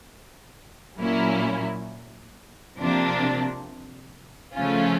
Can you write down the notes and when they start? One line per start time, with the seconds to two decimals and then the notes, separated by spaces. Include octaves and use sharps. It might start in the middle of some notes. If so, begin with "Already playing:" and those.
1.00 A#2 F#3 A#3 C#4 E4
2.78 C3 F3 A#3 D4
4.55 C#3 F3 A3 C#4 F4